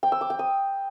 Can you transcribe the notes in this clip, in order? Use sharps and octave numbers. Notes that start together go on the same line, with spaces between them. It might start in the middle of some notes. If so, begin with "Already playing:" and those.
G5
E6
D6
G5
D#6